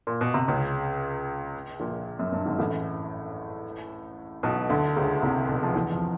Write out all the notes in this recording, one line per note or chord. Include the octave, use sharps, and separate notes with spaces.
A#2
B2
C3
C#2 C#3
A#1 A#2
F#2
G2
G#1 G#2
A1 A2
B1 B2
D2 D3
C#2 C#3
C2 C3
B1 B2
F3
E2 E3
F2 F3